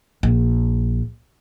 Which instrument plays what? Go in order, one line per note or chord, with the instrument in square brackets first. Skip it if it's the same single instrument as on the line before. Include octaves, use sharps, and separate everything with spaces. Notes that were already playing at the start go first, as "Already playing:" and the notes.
[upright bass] A#1